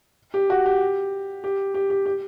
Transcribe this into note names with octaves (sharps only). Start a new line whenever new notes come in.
G4
F#4
G4
G4
G4
G4
G4